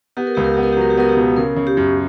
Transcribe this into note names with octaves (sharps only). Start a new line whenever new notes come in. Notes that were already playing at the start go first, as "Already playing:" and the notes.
B3 G4
A#4
C#2 G4
A#4
B3 G4
A#4
G4
F#3 A#4
G4
B3 A#4
G4
B2
C#3 A#4
C#3
G4
F#2